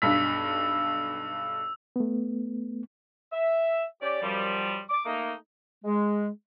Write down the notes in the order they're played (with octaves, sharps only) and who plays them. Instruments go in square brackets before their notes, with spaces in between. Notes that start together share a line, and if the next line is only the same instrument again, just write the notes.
[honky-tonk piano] B1 G2 B6 [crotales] E6
[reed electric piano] A3 B3
[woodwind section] E5
C#4 G4 D5
F#2 F3 G3
D6
A3 A#3 D#4
G#3